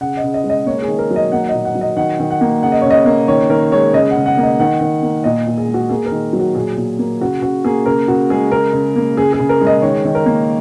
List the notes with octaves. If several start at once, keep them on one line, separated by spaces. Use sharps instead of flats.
C#3 F#5
D#5
C#3
D#5
G#3
D#5
A#3 C#5
G#4
D#3
A#4
F#3
D#5
A#3 F#5
A#2 D#5
F#5
F#3
D#5
D#3 F#5
D#3
F#5
A#3
C#3 F#5
D#5
C#3 C#5
D#5
A#3
D#3 C#5
D#3 A#4
G#3 C#5
C#3 D#5
F#5
C#3
F#5
A#3
D#5
D#3 F#5
D#3
A#3
A#2 D#5
A#2
G#4
G#3
F#4
A#3 G#4
A#4
D#3
F#3
F#4
A#2 G#4
A#2
A#3
C#3 F#4
C#3 F#4
A#3 G#4
C#3 A#4
C#3 F#4
G#3 G#4
C#3 A#4
C#3
A#3
C#3 G#4
G#4
C#3
A#4
G#3
D#5
D#3 C#5
D#3
A#4
A#3